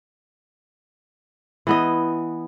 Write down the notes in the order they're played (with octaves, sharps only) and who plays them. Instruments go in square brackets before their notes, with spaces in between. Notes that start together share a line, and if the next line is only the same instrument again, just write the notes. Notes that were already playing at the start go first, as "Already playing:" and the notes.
[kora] E3 B3 D#5